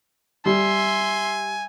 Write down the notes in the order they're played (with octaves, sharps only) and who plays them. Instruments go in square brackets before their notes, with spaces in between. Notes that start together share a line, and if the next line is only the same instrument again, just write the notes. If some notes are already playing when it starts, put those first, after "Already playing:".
[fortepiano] G3 [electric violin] E5 C6 [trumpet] G#5